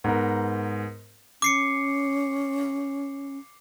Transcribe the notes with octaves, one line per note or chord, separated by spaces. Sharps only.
G#2 B3 A#4
C#4 D6 C7 C#7